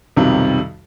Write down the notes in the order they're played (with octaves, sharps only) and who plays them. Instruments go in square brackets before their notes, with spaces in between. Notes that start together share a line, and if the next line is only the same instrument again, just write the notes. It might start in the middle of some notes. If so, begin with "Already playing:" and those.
[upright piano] B1 F2 C3 D#3 G3